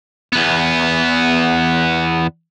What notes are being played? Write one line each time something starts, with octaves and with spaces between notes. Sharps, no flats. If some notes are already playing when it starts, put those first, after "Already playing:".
E2 B3